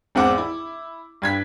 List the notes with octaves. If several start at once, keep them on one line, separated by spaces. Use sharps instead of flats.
G#1 E2 C4 F#5 D6
E4
G2 G#6 B6